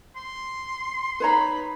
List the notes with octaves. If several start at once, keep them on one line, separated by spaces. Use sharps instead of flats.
C6
D#4 B4 C#5 A#5 B5